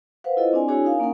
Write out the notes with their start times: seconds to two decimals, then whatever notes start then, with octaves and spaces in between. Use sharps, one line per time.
0.24 B4 C5 F5 F#5
0.37 E4 F4 A4 C5 D#5
0.53 C4 D4 D5 G#5
0.68 D4 E4 F#4 G#4 C#5 G#5
0.84 D#4 A#4 F5 G#5
1.00 A#3 C#4 D#4 A#4 F#5